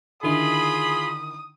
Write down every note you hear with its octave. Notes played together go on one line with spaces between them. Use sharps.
D3 D#3 E4 F4 G#4 B5 D#6